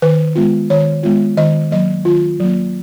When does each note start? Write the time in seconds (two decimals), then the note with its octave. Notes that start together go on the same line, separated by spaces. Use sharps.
0.02 D#3 B4
0.35 G#3 B3 F4
0.70 D#3 C#5
1.03 G#3 B3 F4
1.37 D#3 D#5
1.71 F#3 A#3 D#5
2.05 D#3 F4
2.40 F#3 A#3